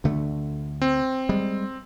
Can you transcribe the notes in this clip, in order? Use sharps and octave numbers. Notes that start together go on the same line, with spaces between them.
D2 D3 A3
C4
G3 G#3